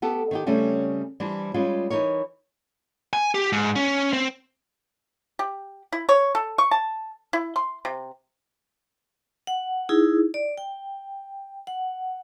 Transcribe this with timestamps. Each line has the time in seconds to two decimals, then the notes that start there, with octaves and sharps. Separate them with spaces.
0.02 B3 G4 A4
0.31 D#3 D#4 G4
0.46 C#3 G3 A3 C4 C#4
1.20 E3 G3 D4 C5
1.54 G3 G#3 C#4 F4
1.90 E3 D#4 A#4 C#5
3.13 G#5
3.34 G4
3.52 G#2
3.76 C#4
4.13 C4
5.39 G4
5.92 E4
6.09 C#5
6.35 A4
6.58 C#6
6.71 A5
7.33 E4
7.56 C6
7.85 C3
9.47 F#5
9.89 D#4 E4 G#4
10.34 D5
10.58 G5
11.67 F#5